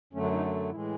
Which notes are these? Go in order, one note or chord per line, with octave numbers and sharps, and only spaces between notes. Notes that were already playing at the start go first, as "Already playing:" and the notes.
F#2 D3 F#3 A3 C#4
D4
D#4
A2 E3 G#3 E4